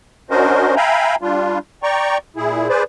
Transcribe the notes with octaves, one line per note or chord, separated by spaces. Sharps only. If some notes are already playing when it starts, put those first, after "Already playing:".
C#4 D4 F#4 A#4 C5 D#5
E5 F5 G5 G#5 A#5 B5
G3 D4 F4
D5 G5 A#5 C#6
A#2 E4 G#4
G#4 B4 C5 D5